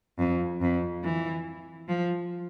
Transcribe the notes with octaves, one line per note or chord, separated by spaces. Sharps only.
F2
F2
E3
F3